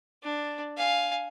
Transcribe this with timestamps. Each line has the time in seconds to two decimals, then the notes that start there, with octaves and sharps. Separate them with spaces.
0.23 D4
0.77 F5 G#5